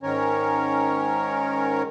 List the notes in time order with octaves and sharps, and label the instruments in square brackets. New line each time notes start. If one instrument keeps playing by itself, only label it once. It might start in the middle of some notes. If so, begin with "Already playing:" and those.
[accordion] G#2 D#3 C#4 A#4 C#5